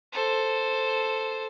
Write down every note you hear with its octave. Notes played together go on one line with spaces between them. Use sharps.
A4 C5